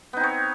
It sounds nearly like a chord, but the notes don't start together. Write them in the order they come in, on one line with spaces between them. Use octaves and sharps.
B3 D#4 C4 C#5